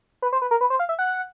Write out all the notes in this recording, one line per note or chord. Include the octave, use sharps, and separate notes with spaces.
B4
C5
B4
A#4
B4
C5
F5
E5
F#5